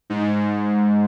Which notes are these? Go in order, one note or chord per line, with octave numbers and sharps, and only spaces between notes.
G#2